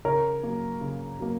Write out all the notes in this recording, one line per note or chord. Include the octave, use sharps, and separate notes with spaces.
C#3 A#4 C#5
F#3 A#3
C#3
F#3 A#3